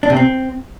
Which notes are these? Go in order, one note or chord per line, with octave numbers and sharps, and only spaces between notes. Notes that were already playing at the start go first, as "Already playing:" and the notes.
D4
C3
C4